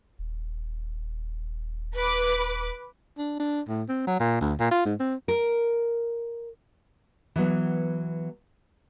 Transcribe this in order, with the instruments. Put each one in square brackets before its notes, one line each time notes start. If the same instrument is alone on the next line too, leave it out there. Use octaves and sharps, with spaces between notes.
[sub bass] D#1
[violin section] B4 D6
[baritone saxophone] D4
D4
A2
C4
F#3
A#2
D2
A#2
F4
G#2
C4
[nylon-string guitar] A#4
E3 F#3 B3